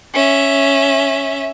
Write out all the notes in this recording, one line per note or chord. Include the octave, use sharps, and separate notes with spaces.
C#4 E5